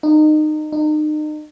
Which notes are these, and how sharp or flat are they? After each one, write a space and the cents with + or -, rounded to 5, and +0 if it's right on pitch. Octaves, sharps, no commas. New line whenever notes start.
D#4 -25
D#4 -35